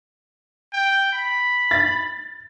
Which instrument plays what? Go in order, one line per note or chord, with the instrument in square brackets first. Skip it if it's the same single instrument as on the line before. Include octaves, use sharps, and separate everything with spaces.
[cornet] G5
B5
[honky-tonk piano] A6